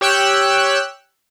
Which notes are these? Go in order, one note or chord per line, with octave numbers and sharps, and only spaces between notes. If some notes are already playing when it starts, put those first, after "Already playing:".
G4 C#5 G5 E6 F#6